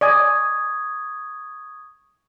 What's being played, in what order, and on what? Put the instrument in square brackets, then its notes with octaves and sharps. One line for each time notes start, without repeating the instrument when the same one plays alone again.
[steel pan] D5 D#5 G#5 [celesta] C#6 D#6 G#6